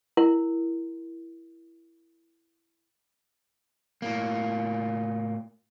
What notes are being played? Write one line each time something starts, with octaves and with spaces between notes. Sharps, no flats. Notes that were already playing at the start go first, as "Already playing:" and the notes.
E4 A#4
A2 A#3